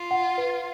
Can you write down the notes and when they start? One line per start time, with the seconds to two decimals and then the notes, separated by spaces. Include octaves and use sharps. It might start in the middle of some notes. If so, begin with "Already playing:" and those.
Already playing: F4
0.11 F#5
0.38 B4